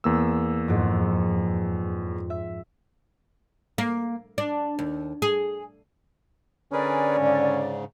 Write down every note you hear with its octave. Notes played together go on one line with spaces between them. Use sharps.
E2 A#3 E6
F2 G#2
E5
A#3
D4
D#2
G#4
D3 C#4 G#4 A#4 B4 D5
G#2 C#3